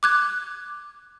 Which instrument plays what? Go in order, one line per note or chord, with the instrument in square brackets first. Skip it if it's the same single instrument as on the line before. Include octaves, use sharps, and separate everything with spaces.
[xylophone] D6 F#6 G#6